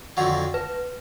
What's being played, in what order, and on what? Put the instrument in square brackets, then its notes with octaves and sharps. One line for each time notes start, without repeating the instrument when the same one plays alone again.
[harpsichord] F2 D3 F#3 [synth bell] F#5
[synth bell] B4